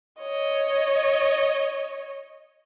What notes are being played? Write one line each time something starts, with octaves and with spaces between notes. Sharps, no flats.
C#5 D#5